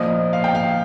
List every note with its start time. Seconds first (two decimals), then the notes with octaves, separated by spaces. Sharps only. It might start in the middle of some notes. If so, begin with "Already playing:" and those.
Already playing: A#2 F3 D#5
0.33 F5
0.44 G5
0.55 F5